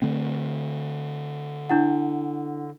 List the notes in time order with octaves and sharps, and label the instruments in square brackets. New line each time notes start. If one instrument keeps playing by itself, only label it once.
[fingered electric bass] D3 A3 C4
[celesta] D4 E4 F#5